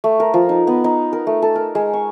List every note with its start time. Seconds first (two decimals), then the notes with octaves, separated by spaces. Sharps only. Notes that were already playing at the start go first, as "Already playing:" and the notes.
0.04 A3
0.20 A#4
0.34 F3
0.49 D#4
0.67 B3
0.84 D#4
1.13 A#4
1.27 A3
1.42 A4
1.55 A#4
1.75 G#3
1.93 C#6